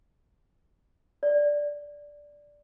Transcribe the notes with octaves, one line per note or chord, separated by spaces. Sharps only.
D5